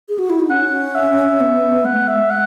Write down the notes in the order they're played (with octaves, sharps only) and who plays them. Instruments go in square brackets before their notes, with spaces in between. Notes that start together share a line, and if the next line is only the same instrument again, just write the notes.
[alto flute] G#4
F#4
E4
D#4
[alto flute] C#4 [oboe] F#5
[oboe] E5
[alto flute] B3
[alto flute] G#3 [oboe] F#5
[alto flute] A3
G#3
[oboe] E5
F#5